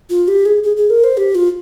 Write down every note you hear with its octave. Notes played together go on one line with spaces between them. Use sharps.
F4
G4
G#4
G#4
G#4
A#4
C5
G4
F4